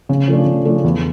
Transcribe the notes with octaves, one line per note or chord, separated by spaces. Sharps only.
C#3
F3 A3 D4
C#3
F3 A3 D4
E2